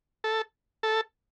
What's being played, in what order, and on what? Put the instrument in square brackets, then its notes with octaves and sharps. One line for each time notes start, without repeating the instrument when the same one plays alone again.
[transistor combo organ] A4
A4